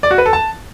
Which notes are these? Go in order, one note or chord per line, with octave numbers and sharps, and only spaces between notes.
D5
F#4
B4
A4
A5